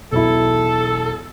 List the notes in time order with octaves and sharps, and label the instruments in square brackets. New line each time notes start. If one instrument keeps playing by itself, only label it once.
[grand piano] E1 B1 E4 [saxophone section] A4